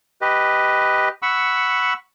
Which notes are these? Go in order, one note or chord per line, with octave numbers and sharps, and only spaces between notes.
G4 B4 D#5
F#5 B5 C#6 E6